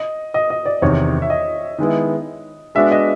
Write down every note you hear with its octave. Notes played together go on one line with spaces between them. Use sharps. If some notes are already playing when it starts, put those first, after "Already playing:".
Already playing: D#5
D#5
D#5
D5
E2 C3 D#3 C#5
E5
D#5
D#3 G#3 B3 E4
G#3 B3 D4 F#4 E5
D#5